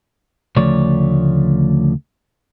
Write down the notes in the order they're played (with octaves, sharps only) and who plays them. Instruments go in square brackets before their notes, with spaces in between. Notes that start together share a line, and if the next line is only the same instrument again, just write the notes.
[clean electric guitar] D2 C#3 F3 A3 C#5 D5